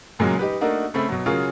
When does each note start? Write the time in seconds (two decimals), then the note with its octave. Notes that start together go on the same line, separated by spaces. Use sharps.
0.19 F#2 A#2 C#3 F#3 G#3
0.39 D#4 G4 B4
0.61 A3 A#3 D4 D#4 F#4 A#4
0.94 C#3 A3 C4 B5
1.09 B2 F#3
1.26 C#3 F#3 C#4 F4 G#4 A#4